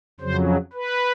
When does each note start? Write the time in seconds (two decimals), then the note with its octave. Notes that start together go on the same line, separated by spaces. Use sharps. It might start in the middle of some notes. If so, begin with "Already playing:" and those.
0.20 F2 C#3 F#3 C5
0.73 B4